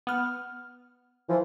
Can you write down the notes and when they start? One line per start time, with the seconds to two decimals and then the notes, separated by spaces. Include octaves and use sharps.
0.07 B3 F6
1.29 E3 F3